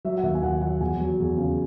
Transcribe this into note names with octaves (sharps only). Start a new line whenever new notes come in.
F#3 E5
F#5
D#2 E5
G#5
D#2 F#5
F#3 F#5
E2 G#5
F#3
E2
C#3